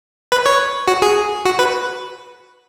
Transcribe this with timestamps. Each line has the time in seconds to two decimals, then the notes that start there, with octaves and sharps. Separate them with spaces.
0.32 B4
0.46 C#5
0.88 F#4
1.02 G#4
1.45 F#4
1.59 B4